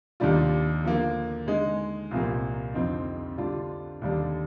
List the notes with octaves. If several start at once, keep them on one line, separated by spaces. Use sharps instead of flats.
D#2 D#3 G3 D4 F4
D3 F3 A#3
D3 G#3 D#4
C2 A#2 F3 A#3
F2 D3 F3 C4 D#4
D3 G3 D4 F4
D#2 D3 G3 D4